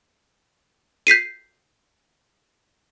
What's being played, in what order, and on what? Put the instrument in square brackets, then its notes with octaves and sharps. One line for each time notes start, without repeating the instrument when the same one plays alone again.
[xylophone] G6 B6 C7 D#7